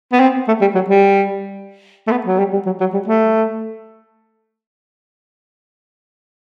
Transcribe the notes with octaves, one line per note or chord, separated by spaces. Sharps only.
B3
C4
A3
G3
F#3
G3
A3
B3
F#3
G3
G3
F#3
F#3
G3
A3